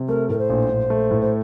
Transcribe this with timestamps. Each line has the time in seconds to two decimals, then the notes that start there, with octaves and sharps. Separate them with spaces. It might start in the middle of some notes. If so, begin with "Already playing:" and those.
Already playing: C3
0.08 A3 A#4
0.29 A2 A#4
0.39 C5
0.50 A#1
0.70 A#1
0.90 A3
1.11 A2
1.21 C5